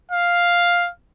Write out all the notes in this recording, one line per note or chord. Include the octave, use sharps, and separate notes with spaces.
F5